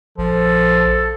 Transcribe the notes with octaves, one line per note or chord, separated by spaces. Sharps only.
A#1 F3 A4